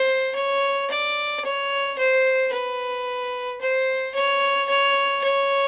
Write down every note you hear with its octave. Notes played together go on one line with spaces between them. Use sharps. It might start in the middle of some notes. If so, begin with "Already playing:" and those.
Already playing: C5
C#5
D5
C#5
C5
B4
C5
C#5
C#5
C#5